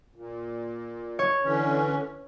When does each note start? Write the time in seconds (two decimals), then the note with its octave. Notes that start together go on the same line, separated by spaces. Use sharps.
0.15 A#2
1.19 C#5
1.44 D3 E3 C#4